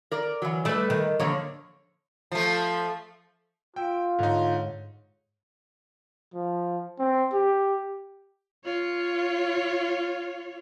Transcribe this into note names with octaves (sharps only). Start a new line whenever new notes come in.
A#4 D5
E3 F#3
A3 A4 B4 D5
D#3
D3 F3 A#3 C#5
F3 A3
F4 G5 E6 B6 D7
G#2 D3 D#4 C#5
F3
C4
G4
F4 C#5